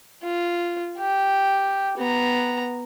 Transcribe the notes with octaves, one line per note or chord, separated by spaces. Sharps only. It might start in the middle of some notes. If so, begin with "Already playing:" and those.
F4
G4
B3 A#5